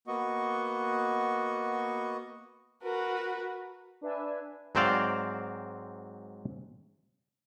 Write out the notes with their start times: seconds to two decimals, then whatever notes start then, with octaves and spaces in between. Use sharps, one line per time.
0.07 A#3 B3 F#4 D#5 C#6
2.82 F#4 A#4 B4
4.01 D4 B4 E5 G#5
4.75 G#2 F#3 C4 C5 D5 F5